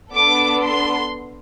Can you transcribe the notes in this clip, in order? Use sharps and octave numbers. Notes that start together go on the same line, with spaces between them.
B3 D4 A4 D6
C6